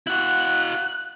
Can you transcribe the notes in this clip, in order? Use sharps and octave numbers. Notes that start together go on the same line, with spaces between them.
E4 F#4 F#6